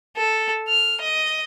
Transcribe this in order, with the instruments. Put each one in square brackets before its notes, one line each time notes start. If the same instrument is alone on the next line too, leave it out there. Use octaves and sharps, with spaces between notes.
[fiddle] A4
F6
D#5